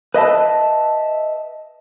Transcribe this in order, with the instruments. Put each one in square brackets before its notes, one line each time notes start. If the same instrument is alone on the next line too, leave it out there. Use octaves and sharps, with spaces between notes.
[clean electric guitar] B4 D#5 E5 A5